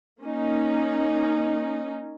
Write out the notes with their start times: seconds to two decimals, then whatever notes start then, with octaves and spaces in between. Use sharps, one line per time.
0.22 A#3 C#4 D#4